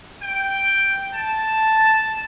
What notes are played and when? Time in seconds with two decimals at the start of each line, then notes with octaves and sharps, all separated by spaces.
0.22 G5
1.13 A5